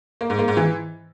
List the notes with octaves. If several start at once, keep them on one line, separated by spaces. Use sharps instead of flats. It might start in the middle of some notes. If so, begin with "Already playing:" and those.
A#3
G#2
A#3
G#2
E3